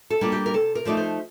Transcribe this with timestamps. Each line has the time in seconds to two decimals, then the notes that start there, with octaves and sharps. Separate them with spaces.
0.10 A4
0.21 G3 A#3 D4 F4
0.32 G4
0.46 A#4
0.54 C3 A4
0.75 A#4
0.85 F3 A3 D#4 D5
0.97 C5